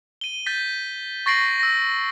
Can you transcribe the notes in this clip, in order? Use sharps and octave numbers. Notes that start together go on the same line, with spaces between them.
D#7 G7
G6 A6 B6
C#6 A6 A#6 C7 D7 F#7
E6 A#6